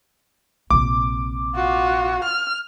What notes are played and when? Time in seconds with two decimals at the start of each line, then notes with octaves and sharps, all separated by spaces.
0.71 A#1 C3 D6
1.55 F4 F#4
2.24 F6